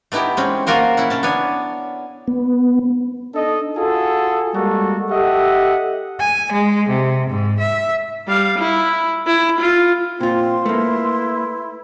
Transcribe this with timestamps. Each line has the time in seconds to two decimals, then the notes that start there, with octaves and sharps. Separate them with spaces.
0.12 A3 B3 D#4 E4 G4
0.37 G#3 C4 C#4
0.67 A#3 F4 F#4 A#4 C5
0.97 C#4 E4 F#5
1.10 C#3 C#4 A5
1.23 B3 D4 C#5 G#5
2.28 B3
3.34 D4 D#4 A4 D#5
3.77 F4 F#4 G#4 A4
4.54 G3 G#3 A#3 F#4 A4
5.11 G4 A4 D#5 E5 F#5
6.20 G#5
6.51 G#3
6.88 C3
7.29 G#2
7.59 E5
8.28 G3 F5
8.58 E4
9.27 E4
9.60 F4
10.21 A#2 C4 F4 C6
10.66 A3 A#3 E4 B4